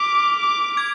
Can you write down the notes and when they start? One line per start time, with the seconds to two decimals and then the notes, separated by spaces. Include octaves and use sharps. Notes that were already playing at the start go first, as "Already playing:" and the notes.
Already playing: D6 F6 B6 F7
0.39 D6
0.77 G#6